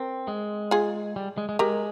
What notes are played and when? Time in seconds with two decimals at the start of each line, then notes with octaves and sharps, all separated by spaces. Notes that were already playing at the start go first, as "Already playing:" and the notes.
Already playing: C4 A#4
0.28 G#3
0.71 F4 G#4
1.16 G3
1.38 G#3
1.49 G#3
1.59 G#3 G4 A#4